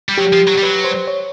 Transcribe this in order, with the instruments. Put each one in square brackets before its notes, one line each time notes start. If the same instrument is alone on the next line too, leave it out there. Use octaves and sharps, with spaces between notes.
[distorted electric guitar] G3
[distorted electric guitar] F#3 [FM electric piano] G4
[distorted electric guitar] F3
F#3
G3
[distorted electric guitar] F#3 [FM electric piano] B4
[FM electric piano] C5
C#5